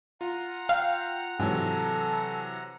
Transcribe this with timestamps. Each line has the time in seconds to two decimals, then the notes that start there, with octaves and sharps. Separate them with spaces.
0.21 F4 F#5 A#5
0.69 F5 G5
1.40 G#2 C3 E3 F#3 A4